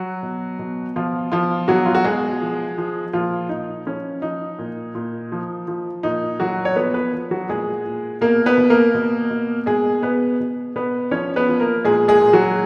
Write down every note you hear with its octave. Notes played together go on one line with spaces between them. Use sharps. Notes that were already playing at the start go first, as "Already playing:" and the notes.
Already playing: F#3 F#4
B2
B2
B2 F3 F4
B2 F3 F4
B2 F#3 F#4
F4
F#4
B2 G#3 G#4
F3
F3
A#2 F3 F4
A#2 D#4
F3 C#4
F3 D#4
A#2
A#2
F3
F3
A#2 D#4
A#2 F#3 F#4
C#5
F3 B3 B4
B3 B4
F3
F#3 F#4
A#2 G#3 G#4
A#2
B2 A#3 A#4
B3 B4
B2
A#3 A#4
B2
B2
B2 G#3 G#4
B2 B3 B4
B2
B2 B3 B4
F3 C#4 C#5
B3 B4
F3
A#3 A#4
A#2 G#3 G#4
G#3 G#4
A#2
F#3 F#4